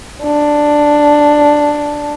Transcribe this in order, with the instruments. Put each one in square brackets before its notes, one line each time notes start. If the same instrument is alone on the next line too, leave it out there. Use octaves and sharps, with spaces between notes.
[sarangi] D4